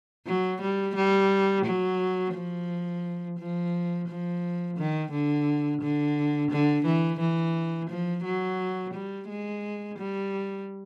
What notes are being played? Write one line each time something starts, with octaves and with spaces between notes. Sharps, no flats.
F#3
G3
G3
F#3
F3
F3
F3
D#3
D3
D3
D3
E3
E3
F3
F#3
G3
G#3
G3